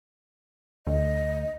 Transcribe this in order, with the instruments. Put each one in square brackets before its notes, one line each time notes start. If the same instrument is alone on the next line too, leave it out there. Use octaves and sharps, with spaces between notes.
[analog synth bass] D2 [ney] D#5